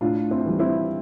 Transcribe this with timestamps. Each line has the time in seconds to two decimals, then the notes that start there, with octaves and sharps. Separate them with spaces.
0.01 A2 D4 F4
0.30 C4 E4
0.46 E3 G3
0.59 C4 E4